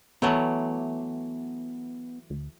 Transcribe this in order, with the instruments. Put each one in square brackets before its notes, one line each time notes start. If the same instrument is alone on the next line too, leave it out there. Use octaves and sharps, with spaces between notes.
[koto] E3 F#3 A3 [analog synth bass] B3
[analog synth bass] D2